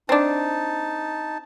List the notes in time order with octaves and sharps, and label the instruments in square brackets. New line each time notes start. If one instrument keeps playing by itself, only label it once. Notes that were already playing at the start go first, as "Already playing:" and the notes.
[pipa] C4 D4 [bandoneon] D#4 A5